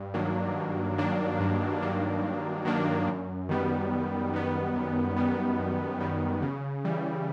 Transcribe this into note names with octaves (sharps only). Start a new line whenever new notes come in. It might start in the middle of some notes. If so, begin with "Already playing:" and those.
Already playing: G2
D#3 F#3 A#3 D4
G2
D#3 F#3 A#3 D4
G2
D#3 F#3 A#3 D4
G2
D#3 F#3 A#3 D4
F#2
D#3 G3 B3
F#2
D#3 G3 B3
F#2
D#3 G3 B3
F#2
D#3 G3 B3
C#3
E3 G3